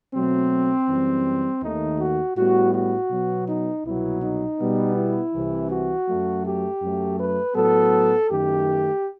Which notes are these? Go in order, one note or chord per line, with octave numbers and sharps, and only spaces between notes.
B2 F#3 A3 C4
F#2 E3 G3
D#2 D#3 A3 D#4
F#4
A2 G3 B3 F#4
F#4
B2 F#3 B3
D#4
C2 B2 F#3 B3 E4
D#4
B2 G3 B3
E4
C2 C3 E3
F#4
F#2 F#3 A3
G4
F#2 F#3 A3
B4
A2 F#3 B3 A4
F#2 D#3 A3 G4